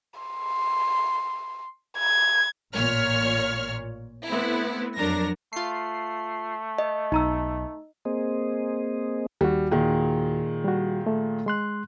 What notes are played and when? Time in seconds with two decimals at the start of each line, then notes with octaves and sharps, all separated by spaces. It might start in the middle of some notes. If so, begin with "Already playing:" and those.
0.20 C6
1.98 G#6
2.73 A1 A#2 C#5 F6
4.28 A3 B3 C4 E4
4.95 F2 F#3 D4 A#4 A#6
5.53 A3 F4 C7
6.78 D#5
7.12 B1 D#4 A#5 E6
8.05 A#3 C4 G#4 C5 D#5
9.41 D#2 G3 F#4
9.71 A#2 D#3 G#3
10.64 G3 F#4
11.07 A3
11.46 G#3 C6 F#6